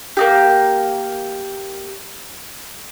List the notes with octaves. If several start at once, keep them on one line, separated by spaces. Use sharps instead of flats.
A#3 D#4 G4